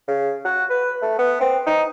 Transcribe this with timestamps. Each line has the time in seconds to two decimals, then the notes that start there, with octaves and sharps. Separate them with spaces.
0.08 C#3
0.45 F#4
0.70 B4
1.02 A3
1.19 B3
1.41 C4
1.67 D#4